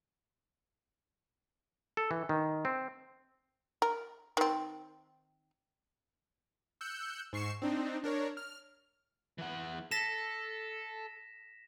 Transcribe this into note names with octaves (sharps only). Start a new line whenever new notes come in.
A4
E3
D#3
C4
A#4
D#3 C4
E6 F#6 G6 C#7
G#2 C#6 C7 C#7 E7
C4 D4 D#4
D4 A#4 C#5
F6
E3 F#5
A4 A#6 B6 E7